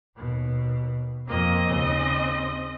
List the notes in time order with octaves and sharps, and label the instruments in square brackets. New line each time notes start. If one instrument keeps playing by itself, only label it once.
[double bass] D#2 B2
[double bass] F2 A#3 [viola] C4 D#5
[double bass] D#2 C#3